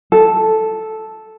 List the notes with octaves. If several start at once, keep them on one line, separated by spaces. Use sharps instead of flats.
A4